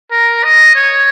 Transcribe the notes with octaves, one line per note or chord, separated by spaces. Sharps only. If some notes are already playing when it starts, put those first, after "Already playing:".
A#4
D#5
C#5